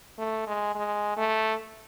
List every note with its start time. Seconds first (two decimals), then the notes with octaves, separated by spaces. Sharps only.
0.19 A3
0.47 G#3
0.75 G#3
1.17 A3